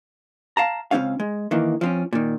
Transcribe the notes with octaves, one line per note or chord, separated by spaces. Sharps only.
F5 A5 A#5
C#2 E3 C4 C#4 F5
G#3
D#3 E3 A#3
F3 C4 C#4
A#2 D#3